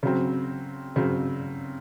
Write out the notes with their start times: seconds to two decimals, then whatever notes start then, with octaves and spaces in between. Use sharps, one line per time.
0.03 C#3 F#3 C4
0.96 C#3 F#3 C4